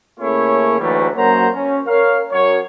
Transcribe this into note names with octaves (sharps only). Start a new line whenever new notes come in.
C#3 A3 A#3 C#4 E4 C#5
D2 G#2 E3 F#3 G3 A3
F#2 F#3 A#3 C5 A#5
C#4
A#4 C#5 F5
F#2 C#5